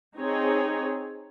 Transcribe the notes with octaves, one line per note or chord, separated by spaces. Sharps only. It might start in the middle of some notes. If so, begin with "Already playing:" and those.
C4 D#4 G#4 C#5